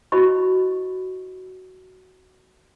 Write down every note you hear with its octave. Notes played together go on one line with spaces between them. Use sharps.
E4 F#4 C5 D#5 B5 C#6